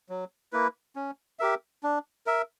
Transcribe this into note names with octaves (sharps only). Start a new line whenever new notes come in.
F#3
A#3 E4 B4
C#4
G4 A#4 E5
D4
A#4 E5